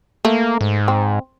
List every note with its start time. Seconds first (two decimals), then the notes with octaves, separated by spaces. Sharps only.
0.25 A3 A#3
0.61 G#2
0.88 C4